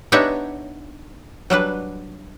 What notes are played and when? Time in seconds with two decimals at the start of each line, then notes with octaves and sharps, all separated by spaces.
0.12 B3 D4 D#4 G4 C#5 E5
1.50 F#3 G3 D4 B4